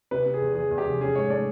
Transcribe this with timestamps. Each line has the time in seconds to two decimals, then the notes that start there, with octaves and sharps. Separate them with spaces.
0.11 C3 B4
0.26 C3
0.34 G#4
0.41 E2
0.55 E3 G#4
0.71 E2
0.78 G4
0.86 F1
1.00 C#4 G#4
1.15 G#2 C#5
1.30 A3 D5